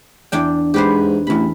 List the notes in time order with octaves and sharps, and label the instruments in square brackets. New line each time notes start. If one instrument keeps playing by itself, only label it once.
[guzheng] E2 D4 G5
[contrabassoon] G#2 [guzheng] G4 B4 C5
[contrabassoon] A1 [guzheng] E2 B5